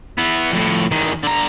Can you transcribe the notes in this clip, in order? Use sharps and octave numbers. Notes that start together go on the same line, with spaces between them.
E3 B3
F2 A2
E2 D#3
D3 A#5